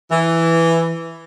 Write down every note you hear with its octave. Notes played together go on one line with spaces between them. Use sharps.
E3